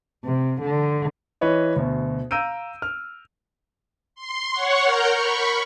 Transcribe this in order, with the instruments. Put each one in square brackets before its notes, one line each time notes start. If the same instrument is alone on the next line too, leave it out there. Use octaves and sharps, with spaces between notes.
[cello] C3
D3
[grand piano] E3 B4 C#5 D#5
D2 B2
F5 A#5 E6 G6 D7 D#7
F6
[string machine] C6
C#5 F#5 C#6
A#4 F6 G6
B5 C#6